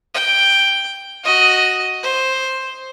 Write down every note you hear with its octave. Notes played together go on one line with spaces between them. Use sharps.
G5
F#4 D#5
C5